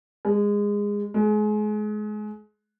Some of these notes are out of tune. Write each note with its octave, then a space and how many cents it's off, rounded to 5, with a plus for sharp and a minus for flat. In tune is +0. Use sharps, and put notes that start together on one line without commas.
G#3 -20
G#3 +30